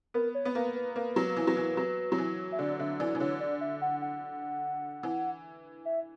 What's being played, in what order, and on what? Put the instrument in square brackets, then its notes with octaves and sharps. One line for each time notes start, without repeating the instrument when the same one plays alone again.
[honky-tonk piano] B3 [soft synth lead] A#4
[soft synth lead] C#5
[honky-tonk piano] B3
[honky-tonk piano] A#3 [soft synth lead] B4
[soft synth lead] B4
[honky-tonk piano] A#3 [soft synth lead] B4
[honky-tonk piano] F#3
E3
F#3
E3
F#3
F#3
E3
[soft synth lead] E5
[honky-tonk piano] D3 [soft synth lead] D5
[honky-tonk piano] D3 [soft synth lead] E5
[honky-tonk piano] E3 [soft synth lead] D5
[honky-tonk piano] E3
[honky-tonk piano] D3 [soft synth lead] C#5
[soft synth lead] D5
E5
F#5
F#5
[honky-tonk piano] E3
[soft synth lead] E5